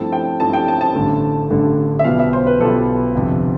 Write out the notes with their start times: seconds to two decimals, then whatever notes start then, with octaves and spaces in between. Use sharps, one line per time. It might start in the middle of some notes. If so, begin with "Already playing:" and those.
Already playing: G2 F3 A3 C4 E4 A5
0.12 G5
0.40 G2 F3 A3 C4 E4 A5
0.53 G5
0.68 A5
0.81 A5
0.95 A1 G2 D3 A3
1.50 A1 G2 D3 A3
1.99 E5
2.04 B1 B2 G3 B3 F4 F5
2.19 E5
2.33 C5
2.47 B4
2.60 B1 B2 G3 B3 F4 A4
3.15 G1 F2 C3